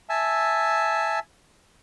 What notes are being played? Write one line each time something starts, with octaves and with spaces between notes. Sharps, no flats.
E5 G#5 A5 E6